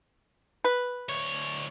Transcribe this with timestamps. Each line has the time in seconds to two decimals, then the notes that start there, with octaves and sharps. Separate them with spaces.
0.64 B4
1.09 D2 C#5